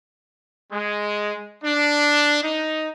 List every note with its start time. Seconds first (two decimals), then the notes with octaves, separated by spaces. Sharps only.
0.72 G#3
1.64 D4
2.43 D#4